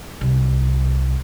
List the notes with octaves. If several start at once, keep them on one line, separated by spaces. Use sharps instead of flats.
C2